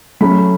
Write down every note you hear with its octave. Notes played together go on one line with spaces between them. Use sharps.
F#3 A3 C#4 B5